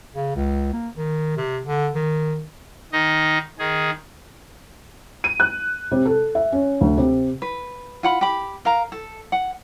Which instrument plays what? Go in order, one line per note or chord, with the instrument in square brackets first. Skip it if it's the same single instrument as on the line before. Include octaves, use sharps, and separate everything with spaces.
[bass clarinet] C#3
C#2
A#3
D#3
C3
D3
D#3
[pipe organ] D#3 D#4 D#5
D#3 G#4
[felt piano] D#7
F#6
C3
A4
E5
C#4
D2
C3
[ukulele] B4
F4 F#5 B5
G4 B5
A#4 F5 A#5
A4
F#5